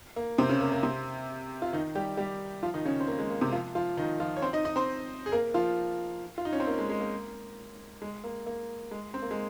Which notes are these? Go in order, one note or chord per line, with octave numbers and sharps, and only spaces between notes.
A#3
C3 C4
C#3 C#4
A#3
A#3
C3 C4
F4
D#3 D#4
G3 G4
G3 G4
F3 F4
D#3 D#4
C#3 C#4
C4
A#3
G#3
A#3
C3 C4
F3 F4
F3 F4
D#3 D#4
F3 F4
C#5
C4 C5
D#4 D#5
D#4 D#5
C4 C5
G#4
A#3 A#4
F3 F4
F4
D#4
C#4
C4
A#3
G#3
G#3
A#3
G#3
A#3
A#3
G#3
C4
A#3
G#3